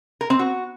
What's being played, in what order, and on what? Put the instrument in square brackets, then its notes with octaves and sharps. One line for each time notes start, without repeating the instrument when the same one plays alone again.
[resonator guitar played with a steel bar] A#4
C4
F#4